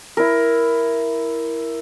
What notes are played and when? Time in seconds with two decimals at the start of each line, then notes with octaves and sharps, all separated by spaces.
0.17 E4 A#4